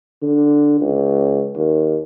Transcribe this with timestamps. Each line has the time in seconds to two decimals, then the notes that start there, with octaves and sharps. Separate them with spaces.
0.23 D3
0.81 C#2
1.56 D#2